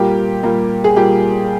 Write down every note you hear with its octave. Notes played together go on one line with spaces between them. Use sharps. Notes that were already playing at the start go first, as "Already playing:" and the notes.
Already playing: A#2 G3 A#3 G4
A#2 G3 A#3
G#4
A#2 G3 A#3 G4